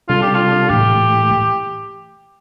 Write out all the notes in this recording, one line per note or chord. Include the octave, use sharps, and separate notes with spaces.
C3 G3 D4 F4 A4
G4
F4
A2 E3 A3 G4